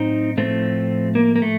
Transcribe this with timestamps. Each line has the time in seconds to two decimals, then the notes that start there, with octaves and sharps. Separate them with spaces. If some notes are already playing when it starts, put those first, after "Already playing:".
Already playing: A2 F#3 C4 D#4
0.37 A2 F3 A3 C4
1.15 A#3
1.36 A#3
1.42 A3